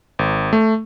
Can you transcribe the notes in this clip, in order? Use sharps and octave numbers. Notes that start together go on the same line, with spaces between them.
G#1
A3